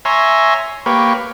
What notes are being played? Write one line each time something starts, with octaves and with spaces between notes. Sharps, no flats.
C#5 E5 G#5 A#5 C6
A#3 G4 B4 C#5